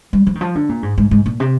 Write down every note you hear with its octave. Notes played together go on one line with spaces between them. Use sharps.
G3
F3
D#3
F3
D3
A#2
G#2
G#2
G#2
A#2
C3